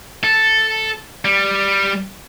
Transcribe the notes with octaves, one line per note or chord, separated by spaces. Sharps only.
A4
G3